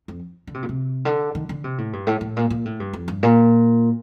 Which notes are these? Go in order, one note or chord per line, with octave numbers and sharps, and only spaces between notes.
F2
D3
C3
A#2
C3
D3
D#3
D3
C3
A2
G2
A2
A2
A#2
A#2
A2
G2
F2
G2
A#2